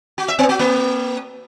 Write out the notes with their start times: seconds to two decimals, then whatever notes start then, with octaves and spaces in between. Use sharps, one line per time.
0.18 F#4
0.28 E5
0.39 B3
0.49 F#4
0.59 A#3